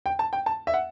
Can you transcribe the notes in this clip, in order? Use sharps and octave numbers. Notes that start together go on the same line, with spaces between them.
G5
A5
G5
A5
E5
F#5